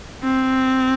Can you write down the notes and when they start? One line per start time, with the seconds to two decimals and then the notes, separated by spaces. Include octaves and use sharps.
0.24 C4